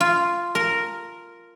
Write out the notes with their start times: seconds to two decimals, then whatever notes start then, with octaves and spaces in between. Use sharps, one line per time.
0.01 F4
0.55 A#4